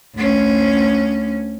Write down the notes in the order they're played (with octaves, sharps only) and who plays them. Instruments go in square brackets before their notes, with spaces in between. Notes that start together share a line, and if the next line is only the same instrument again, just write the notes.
[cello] D2 C#4